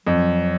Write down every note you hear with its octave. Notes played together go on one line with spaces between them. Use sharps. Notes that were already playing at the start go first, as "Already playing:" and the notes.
F2 F#3